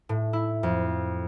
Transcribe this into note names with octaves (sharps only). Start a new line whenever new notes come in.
A2
E4
F2